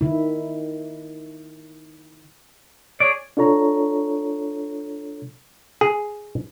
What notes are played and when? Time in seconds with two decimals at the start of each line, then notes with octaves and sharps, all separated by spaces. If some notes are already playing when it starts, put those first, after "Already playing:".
0.01 D#3 E4
3.00 G#4 C#5 D5
3.37 D4 F4 A4 C#5 A#5
5.81 G#4